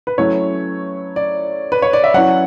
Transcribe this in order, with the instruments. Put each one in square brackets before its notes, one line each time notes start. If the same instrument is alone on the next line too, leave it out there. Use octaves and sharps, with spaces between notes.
[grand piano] B4
F#3 A3 C#4 E4 C#5
D5
B4
C#5
D5
E5
F#3 C#4 E4 F#5